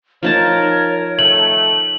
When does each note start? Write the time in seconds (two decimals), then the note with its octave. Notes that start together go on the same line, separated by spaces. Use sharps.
0.23 F3 D#4 A#4 C#5 A5
1.19 D#3 A3 F#7